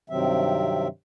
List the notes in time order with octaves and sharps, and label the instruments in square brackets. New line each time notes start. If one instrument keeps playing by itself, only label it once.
[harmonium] G2 C3 D#3 F#3 C4 E5